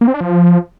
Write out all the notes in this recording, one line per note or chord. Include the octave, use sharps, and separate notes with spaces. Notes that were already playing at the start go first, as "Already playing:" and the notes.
A#3
C4
D4
F3